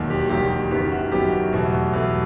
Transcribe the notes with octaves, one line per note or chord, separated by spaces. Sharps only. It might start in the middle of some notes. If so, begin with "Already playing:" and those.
Already playing: E1 D#2 D#3 F#3
G4
E1 D#2 D#3 F#3 G4
F#1 F#2 D#3 F#3 B3 G4
F#4
F#1 F#2 D#3 F#3 B3 G4
E2 B2 F#3 A3
E2 B2 F#3 A3